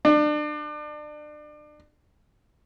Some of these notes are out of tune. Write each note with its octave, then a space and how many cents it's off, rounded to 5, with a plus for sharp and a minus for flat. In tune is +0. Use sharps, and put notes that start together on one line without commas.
D4 +30